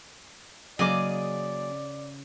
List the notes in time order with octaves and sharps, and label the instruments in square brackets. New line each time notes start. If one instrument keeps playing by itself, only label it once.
[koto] C#3 [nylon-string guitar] F#3 A#3 C#4 [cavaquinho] G#4 D#5 D6 [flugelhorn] D5